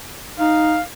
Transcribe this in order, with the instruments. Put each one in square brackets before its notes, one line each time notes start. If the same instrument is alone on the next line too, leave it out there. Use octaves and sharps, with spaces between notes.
[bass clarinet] D#4 [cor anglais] F5